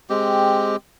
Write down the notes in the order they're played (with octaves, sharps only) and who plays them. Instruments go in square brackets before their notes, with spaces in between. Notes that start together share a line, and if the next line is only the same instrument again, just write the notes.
[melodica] G#3 C4 G4